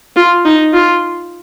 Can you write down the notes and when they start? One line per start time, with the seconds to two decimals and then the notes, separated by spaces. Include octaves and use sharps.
0.16 F4
0.45 D#4
0.73 F4